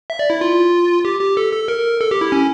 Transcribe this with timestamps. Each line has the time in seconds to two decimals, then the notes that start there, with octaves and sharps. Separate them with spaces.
0.10 E5
0.19 D5
0.30 E4
0.41 F4
1.05 G4
1.20 G4
1.37 A4
1.52 A4
1.68 A#4
2.01 A4
2.11 G4
2.21 E4
2.32 C#4